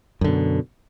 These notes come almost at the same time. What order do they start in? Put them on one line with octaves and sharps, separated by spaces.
F#2 D3 B2